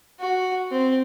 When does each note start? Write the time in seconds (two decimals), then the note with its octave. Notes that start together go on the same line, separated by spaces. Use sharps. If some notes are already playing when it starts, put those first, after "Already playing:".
0.20 F#4
0.71 C4